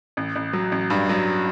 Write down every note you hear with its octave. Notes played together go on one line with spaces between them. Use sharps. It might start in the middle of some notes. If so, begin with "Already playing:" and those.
A1
A1
F#3
A1
G2
F#3